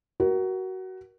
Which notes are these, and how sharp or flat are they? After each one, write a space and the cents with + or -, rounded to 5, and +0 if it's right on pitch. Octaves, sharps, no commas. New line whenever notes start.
F#4 +20 A#4 +20